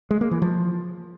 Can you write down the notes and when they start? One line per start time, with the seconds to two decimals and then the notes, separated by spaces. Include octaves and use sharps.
0.11 G#3
0.21 A#3
0.31 E3
0.42 F3